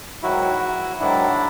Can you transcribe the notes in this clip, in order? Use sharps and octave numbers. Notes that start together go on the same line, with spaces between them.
G#2 D#3 F#3 E4 F#4
G#2 D#3 F#3 D4 E4